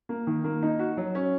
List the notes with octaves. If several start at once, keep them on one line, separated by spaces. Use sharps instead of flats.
A#3
D#3
A#3
D#4
F#4
F#3
C#4